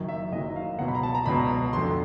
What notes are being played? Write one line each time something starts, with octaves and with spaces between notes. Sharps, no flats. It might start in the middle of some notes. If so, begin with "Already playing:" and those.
Already playing: F#1 F#2 D#3 F#3
E5
F#1 F#2 D#3 F#3 D#5
F5
C#2 B2 F#3 F#5
B5
A#5
A5
A#5
C#2 B2 F#3 B5
G1 F2 D3 C6